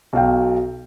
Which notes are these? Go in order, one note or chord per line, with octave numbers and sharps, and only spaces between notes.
B1 F#3 F5 G5